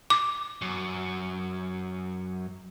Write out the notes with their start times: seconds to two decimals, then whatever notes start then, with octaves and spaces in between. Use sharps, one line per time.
0.10 D6
0.62 F#2